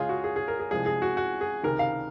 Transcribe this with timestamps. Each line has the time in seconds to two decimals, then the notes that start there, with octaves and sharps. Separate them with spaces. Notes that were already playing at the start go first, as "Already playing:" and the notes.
Already playing: C#2 C#3 G#3 F4 G#4
0.09 F#4
0.24 G#4
0.36 G#4
0.48 A#4
0.59 G#4
0.71 C2 C3 F3 G#3 G#4
0.86 G#4
1.02 F#4
1.17 F#4
1.41 G#4
1.63 C#2 C3 D#3 A#4
1.79 F5